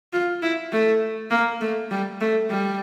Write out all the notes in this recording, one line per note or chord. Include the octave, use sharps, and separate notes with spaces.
F4
E4
A3
A#3
A3
G3
A3
G3